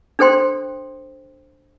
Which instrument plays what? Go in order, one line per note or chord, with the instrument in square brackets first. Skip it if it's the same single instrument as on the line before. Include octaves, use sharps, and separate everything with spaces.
[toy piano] D4 A4 C5 G5 C6